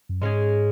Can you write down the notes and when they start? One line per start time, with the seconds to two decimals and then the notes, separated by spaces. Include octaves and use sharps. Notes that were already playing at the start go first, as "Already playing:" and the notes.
0.09 F#2
0.21 G#2 G#3 C#4 G#4